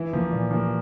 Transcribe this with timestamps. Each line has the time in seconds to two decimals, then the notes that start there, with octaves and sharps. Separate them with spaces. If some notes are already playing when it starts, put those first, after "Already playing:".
Already playing: E3 E4
0.13 F3 A#3
0.32 A#2
0.51 F3 A#3